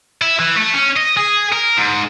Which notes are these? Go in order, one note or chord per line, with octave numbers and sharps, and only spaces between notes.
E4
E3
A3
C#4
D#5
G#4
A#4
G#2